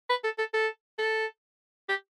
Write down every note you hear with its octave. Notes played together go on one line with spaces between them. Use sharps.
B4
A4
A4
A4
A4
G4